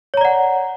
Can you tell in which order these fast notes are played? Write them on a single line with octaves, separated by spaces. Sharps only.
C#5 A#5 D5 F#5